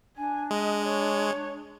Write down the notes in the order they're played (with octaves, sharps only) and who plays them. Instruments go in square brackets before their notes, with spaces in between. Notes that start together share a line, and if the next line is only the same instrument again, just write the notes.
[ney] D4 [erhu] G#5
[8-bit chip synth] G#3 [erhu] D#5
[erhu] C#5